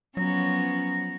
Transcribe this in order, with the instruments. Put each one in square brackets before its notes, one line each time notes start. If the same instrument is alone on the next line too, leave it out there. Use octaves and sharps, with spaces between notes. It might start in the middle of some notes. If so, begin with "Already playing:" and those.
[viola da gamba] F3 B3 C#4 [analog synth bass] F#3 [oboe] A#5